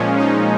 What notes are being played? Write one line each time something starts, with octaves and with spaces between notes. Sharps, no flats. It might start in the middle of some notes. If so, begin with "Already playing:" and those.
Already playing: A#2 F3 G#3 C#4
D#4